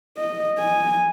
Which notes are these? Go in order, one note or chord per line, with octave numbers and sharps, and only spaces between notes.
D#5
G#5